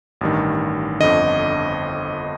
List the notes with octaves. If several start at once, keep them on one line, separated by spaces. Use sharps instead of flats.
A1 G2 D#3
G1 F2 D3 D#5